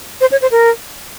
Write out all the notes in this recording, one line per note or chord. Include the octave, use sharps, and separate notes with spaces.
C5
C#5
C5
A#4